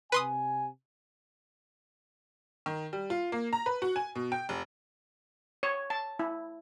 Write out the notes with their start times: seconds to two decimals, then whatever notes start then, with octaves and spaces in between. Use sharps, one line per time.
0.12 C3 B4 G#5 C6 D#6
2.66 D#3
2.93 G3
3.10 F4
3.32 A#3
3.53 A#5
3.66 B4
3.82 F#4
3.96 G#5
4.15 B2
4.32 G5
4.49 F1
5.63 C#5
5.90 A5
6.19 E4